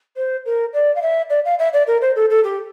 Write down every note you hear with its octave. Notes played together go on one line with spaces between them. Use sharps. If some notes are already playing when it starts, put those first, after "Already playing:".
C5
A#4
D5
F5
E5
D5
F5
E5
D5
A#4
C5
A4
A4
G4